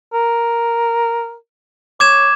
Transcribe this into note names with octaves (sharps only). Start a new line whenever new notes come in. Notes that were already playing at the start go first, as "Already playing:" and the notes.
A#4
C#5 D6 G#6 E7